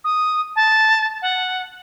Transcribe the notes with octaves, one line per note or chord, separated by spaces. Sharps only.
D#6
A5
F#5